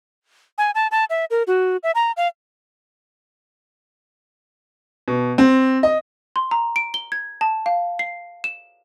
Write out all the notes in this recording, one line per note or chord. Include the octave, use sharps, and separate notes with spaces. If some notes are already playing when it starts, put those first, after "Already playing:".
G#5
A5
A5
E5
A#4
F#4
E5
A#5
F5
B2
C4
D#5
C6
A#5
D7
G7
G#6
A5
F5
C7
E7